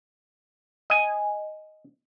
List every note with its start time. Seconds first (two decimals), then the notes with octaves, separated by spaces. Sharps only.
0.90 D#5 G#5